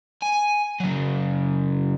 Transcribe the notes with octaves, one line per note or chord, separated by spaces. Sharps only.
G#5
C#3 F#3